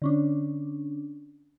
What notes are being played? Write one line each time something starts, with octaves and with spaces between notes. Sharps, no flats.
D3 C#4 D4